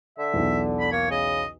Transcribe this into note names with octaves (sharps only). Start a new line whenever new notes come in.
D3 E5
B1 E2
B5
A#3 C#5
C#3 D#5